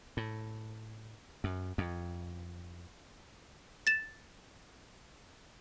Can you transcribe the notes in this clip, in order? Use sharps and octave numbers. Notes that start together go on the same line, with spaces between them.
A2
F#2
F2
A6 E7